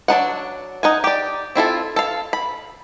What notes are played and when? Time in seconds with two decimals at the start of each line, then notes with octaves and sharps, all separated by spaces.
0.08 F#3 D4 D#4 F#5
0.83 D#4 F#5 G#5
1.04 G4 D5
1.55 C4 E4 F4 A4
1.96 A4 F5
2.33 B5